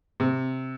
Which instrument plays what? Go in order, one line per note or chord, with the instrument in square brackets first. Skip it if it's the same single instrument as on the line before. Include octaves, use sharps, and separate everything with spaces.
[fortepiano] C3